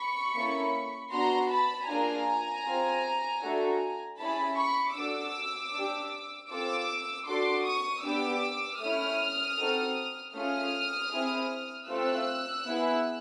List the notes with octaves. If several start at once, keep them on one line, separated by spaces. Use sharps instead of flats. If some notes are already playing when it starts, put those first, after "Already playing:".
Already playing: B5 C#6
A#3 C#4 E4 A4
B3 D4 F#4 A#5 C6
A5 B5
A#3 D4 F4 G#4 G#5 A#5
C4 F4 G#4
A3 D4 F#4 A4
C#4 E4 G#4 A5 B5
B5 C#6
D4 F#4 A4 D6 E6
D4 G4
C4 F4 A4 D6 E6
D4 F#4 A4 C6 D6
C#6 D#6
B3 D4 G4 D6 E6
A3 C#4 E4 D#6 F6
C4 D#4 F#4 A4
A3 C#4 F4 G#4 D#6 F6
C4 E4 G#4
A3 C4 F4 A4 E6 F#6
B3 E4 G#4